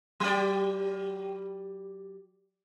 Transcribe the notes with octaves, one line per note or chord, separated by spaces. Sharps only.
F#3 G4 D5